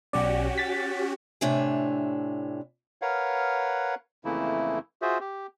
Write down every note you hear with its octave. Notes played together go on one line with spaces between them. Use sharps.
B1 C#4 F#4 G4 D5
A6 B6
A2 C3 D4 C#5 E5 G#5
A#4 B4 C#5 F5 F#5
F2 C#3 E3 A3 A#3 E4
F4 F#4 G#4 C5 E5
G4